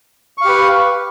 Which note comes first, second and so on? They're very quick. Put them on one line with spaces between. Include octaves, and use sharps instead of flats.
C#6 F5 G4 B4